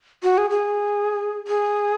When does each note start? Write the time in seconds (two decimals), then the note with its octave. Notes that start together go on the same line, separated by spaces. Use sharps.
0.23 F#4
0.38 G#4
0.50 G#4
1.48 G#4